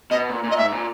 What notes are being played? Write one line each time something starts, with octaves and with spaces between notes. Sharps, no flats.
B2 D#5
A#2
A#2
D#5
G#2 E5
A#2